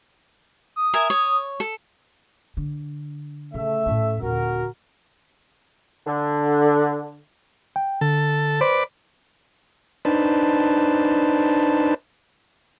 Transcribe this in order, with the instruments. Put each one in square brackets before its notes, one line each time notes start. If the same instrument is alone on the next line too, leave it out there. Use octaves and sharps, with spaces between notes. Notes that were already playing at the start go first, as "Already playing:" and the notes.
[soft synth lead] D#6
[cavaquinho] A#4 E5 G#5
C#5
A4
[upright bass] D3
[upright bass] C#3 [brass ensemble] A3 E5
[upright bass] A2 C#4
[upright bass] D#1 D3 [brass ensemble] F#4 A#4
[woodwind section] D3
[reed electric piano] G5
[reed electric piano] D3 [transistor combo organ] A4
[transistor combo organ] B4 D5 [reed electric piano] C5
[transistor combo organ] D4 D#4 B4 C5 A5